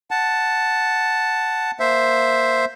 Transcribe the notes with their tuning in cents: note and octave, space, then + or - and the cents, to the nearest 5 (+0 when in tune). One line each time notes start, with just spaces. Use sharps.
F#5 +0 A5 +0
A#3 +5 C5 +0 E5 +0